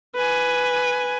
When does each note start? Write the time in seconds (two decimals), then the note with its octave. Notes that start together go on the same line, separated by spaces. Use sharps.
0.15 B4 G#5